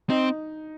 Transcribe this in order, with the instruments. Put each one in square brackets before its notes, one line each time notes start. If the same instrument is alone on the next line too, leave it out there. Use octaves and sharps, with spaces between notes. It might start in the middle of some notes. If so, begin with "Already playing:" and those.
[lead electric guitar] C4 [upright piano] D#4